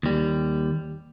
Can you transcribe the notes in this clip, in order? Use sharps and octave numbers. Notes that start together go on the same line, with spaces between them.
D#2 G3